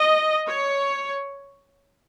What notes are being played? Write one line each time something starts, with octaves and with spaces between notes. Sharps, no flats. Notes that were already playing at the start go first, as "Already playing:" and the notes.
Already playing: D#5
C#5